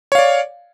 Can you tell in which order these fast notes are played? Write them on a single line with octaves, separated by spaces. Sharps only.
C#5 F5 D5